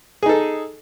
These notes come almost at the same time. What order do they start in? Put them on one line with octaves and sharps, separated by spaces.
G#4 D#4 A4